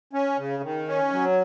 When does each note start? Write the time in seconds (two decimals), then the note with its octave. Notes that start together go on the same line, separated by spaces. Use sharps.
0.13 C#4
0.38 C#3
0.63 D#3
0.88 C#4
1.12 F#3